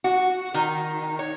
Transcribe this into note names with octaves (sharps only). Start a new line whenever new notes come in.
F#4
D#3
C#5